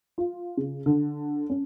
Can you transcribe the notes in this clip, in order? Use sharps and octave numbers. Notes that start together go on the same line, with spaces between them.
F4
C#3
D3
C#4